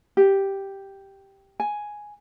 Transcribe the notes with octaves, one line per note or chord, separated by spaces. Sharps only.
G4
G#5